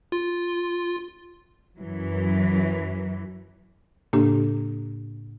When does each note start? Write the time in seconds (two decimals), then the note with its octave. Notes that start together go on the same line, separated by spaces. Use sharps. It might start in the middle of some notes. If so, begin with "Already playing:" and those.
0.12 F4
1.77 F#2 E3 F#3
4.13 A2 C#3 A#3 D4 G4